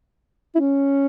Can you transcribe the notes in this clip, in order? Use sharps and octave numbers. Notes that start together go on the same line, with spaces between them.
E4
C#4